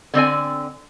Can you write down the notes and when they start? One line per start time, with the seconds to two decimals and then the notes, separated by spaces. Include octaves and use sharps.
0.14 D3 C4 D5 G#5